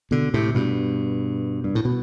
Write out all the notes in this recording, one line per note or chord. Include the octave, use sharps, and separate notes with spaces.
B2 D3
A2 C3
G2 B2
G2
A2
B2